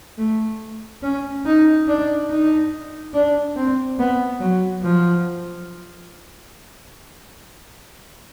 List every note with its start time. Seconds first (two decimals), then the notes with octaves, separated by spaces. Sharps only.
0.18 A3
1.03 C#4
1.46 D#4
1.88 D4
2.30 D#4
3.14 D4
3.56 C4
3.99 B3
4.40 F#3
4.83 F3